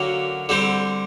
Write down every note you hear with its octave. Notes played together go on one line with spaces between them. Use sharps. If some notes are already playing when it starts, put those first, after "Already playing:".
Already playing: D3 F#3 A#3 C#4
D3 G3 C4